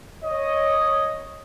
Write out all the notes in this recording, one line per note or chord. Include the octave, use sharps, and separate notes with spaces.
C#5 D#5